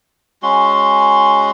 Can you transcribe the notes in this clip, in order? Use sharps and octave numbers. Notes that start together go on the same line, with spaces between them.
G#3 C#4 F#4 C6